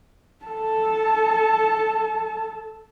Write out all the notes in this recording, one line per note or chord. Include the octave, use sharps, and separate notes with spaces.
A4 A5